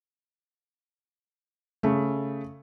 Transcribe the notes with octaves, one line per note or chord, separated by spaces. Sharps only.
C#3 A3